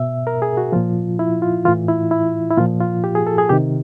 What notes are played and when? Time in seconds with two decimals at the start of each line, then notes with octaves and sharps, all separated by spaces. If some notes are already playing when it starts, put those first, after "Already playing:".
Already playing: B2 E5
0.27 A#4
0.42 G#4
0.57 F#4
0.72 A#2 F3 F4
1.19 E4
1.42 F4
1.65 A2 E3 F4
1.88 E4
2.11 E4
2.51 E4
2.57 A#2 F3 F4
2.81 F4
3.04 G4
3.15 G#4
3.27 A4
3.38 G#4
3.49 C3 D#3 G4